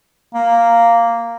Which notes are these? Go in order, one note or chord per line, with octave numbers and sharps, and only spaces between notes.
A#3